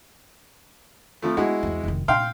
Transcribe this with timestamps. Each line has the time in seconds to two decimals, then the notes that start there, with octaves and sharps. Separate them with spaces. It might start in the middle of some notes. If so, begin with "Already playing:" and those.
1.22 F2 F3 A3
1.37 G#3 B3 E4 F#4
1.63 E2 C4
1.84 F1 D#3
2.08 A#2 F5 G5 C6